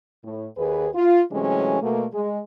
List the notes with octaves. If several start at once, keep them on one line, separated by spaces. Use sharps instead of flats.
A2
D#2 G#4 B4
F4
C3 E3 F#3 G#3 A3 C#4
B2 A3 A#3
G#3